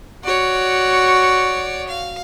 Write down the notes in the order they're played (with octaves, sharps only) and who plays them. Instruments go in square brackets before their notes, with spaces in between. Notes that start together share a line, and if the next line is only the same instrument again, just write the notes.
[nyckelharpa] F#4 [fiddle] C#5 D5
[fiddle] F5